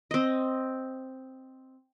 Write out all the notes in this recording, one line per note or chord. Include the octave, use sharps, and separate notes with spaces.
C4 D#5